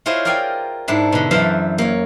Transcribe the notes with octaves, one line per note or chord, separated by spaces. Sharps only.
E4 F4 G#4 C5 C#5 D#5
A#4 D5 F5 G5 G#5
G#2 D4 E4
B2 D3
F#2 E3 B4 C5 F5 A5
A#3 C#5